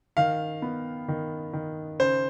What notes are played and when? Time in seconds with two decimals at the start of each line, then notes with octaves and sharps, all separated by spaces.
0.17 D#3 F5
0.62 B3
1.08 D#3
1.53 D#3
1.99 C#3 C5